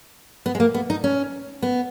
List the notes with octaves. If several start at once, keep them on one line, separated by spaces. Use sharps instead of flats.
B3
G#3
A#3
B3
D#4
C#4
B3